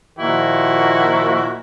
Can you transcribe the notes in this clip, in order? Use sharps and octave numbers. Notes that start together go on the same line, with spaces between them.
A#2 D#3 F3 E4 F#4